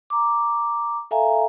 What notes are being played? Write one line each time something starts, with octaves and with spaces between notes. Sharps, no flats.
A#5 D6
A4 E5 F5 G#5 A#5